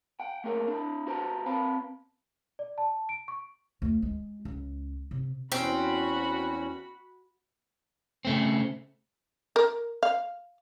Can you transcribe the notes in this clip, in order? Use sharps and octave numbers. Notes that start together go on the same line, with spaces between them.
F#5 G5
A3 A#3 C#4 G#4 A#4
D4 E4
F#4 B4 C5 A5 A#5
C4 B4 F5 A5 B5
D5
A5
D7
C#6
D2
G#3
C#2
C3
E2 C4 C#4 F#4 B5
C#3 A3 C4
A#4
F5